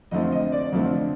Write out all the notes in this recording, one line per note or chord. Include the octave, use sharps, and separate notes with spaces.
F2 D3 F3 A3 C4 D#5
D#5
D5
F2 D3 F3 A3 C4